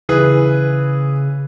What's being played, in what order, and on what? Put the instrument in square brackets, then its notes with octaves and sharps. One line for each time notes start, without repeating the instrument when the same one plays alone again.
[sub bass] C#3 [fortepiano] E3 G#4 B4